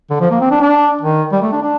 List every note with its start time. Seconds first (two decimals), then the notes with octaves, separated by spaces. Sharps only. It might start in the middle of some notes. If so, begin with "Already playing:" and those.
0.10 D3
0.21 F3
0.31 A#3
0.41 C4
0.51 D4
0.61 D4
1.02 D#3
1.32 G3
1.42 A3
1.52 D4
1.62 D4